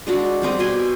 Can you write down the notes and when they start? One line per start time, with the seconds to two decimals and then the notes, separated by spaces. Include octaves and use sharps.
0.07 G#3 D4 F#4
0.42 G3 C4 C5 D#5
0.59 B2 G4 G#5 C6